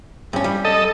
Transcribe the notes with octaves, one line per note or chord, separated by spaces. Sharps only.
G2 C#4
G3
A4 D#5